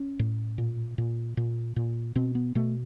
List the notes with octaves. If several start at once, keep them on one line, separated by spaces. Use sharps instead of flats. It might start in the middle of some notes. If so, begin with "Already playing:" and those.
Already playing: C#4
A2
A#2
A#2
A#2
A#2
B2 C4
B3
B2 A3